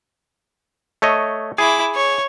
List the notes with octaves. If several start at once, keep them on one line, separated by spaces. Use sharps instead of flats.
A3 C#5 D#5
E4 G#4 D6
C#5